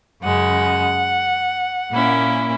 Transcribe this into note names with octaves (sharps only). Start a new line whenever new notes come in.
F#2 C#3 G#3 F#5
A#2 A#3 C#4 E4